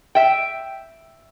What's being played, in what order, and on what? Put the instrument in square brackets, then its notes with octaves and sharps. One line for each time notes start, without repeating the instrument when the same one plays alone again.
[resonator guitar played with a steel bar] E5 G5